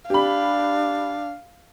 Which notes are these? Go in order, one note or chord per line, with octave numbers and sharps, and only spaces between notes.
D4 G4 F5 B5